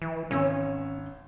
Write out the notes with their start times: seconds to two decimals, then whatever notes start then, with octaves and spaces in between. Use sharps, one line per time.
0.02 E3
0.31 G#1 C#4 C#5 E6